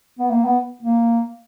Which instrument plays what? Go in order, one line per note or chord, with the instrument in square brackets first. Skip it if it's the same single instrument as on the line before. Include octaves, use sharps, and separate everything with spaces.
[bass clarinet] B3
A#3
B3
A#3